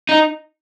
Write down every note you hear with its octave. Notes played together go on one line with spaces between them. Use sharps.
D#4